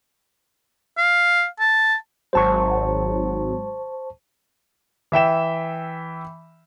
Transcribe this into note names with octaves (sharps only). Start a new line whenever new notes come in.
F5
A5
G#1 F#3 C5 A5 C#6
E3 E5 G5 E7